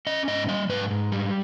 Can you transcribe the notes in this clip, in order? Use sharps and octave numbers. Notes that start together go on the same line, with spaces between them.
C#4 D#5
G#2 D#5
G3 D#5
G#2 B4
G#2
G3